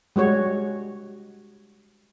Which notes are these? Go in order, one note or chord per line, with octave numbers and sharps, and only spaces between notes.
G3 G#3 F#4 C#5